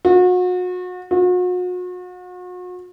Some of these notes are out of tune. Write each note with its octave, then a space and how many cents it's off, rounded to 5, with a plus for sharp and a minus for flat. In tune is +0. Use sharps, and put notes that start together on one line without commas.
F#4 -35
F#4 -40